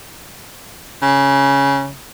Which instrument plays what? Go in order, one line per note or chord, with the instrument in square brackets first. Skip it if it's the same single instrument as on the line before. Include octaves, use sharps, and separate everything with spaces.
[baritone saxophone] C#3